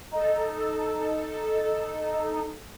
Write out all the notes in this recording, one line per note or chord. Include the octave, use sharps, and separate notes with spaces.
D#4 A4